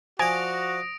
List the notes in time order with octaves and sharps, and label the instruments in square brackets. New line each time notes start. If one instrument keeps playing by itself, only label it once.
[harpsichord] F3 D5 [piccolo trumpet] F#4 [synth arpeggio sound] G#5 [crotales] D#6 A#6 D7